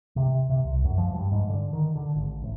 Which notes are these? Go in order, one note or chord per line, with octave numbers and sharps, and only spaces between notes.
C3
C3
C2
F#2
F3
G2
G#2
D3
D#3
D3
G#1
A1